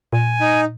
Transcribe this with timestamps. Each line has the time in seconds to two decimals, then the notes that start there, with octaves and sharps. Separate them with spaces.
0.13 A#2 G#5
0.41 D#4